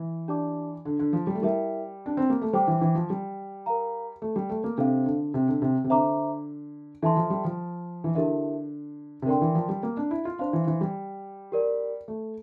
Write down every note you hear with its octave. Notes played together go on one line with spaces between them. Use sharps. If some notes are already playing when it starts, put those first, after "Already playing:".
Already playing: E3
D4 G4 D5 A5 D6
D3
D3
F3
G3
A3
G3 E4 A#4 E5
D4
C4
A#3
A3
G3 C5 G5 D6
E3
E3
F3
G3
A#4 F5 A#5
A3
G3
A3
A#3
C3 D4 A4 C5 F5
D3
C3
D3
C3
C3
D3 C5 E5 A#5 D6
E3 A4 E5 A5 C6
F3
G3
F3
E3
D3 E4 G4 A#4 E5
C3
D3 A#4 D5 G5 C6
E3
F3
G3
A#3
D4
E4
F4
D4 C5 F5 C6
E3
E3
G3
G4 A#4 D5
A3